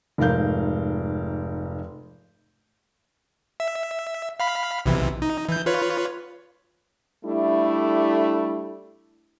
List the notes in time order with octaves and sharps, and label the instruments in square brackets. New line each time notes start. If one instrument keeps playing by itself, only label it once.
[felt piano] F1 G#2 A#4 F5 G6
[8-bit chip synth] E5
F5 B5 B6
B1 C3 E3
D#4
E3 G6
F4 B4 C#5
[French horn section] G3 A3 D4 E4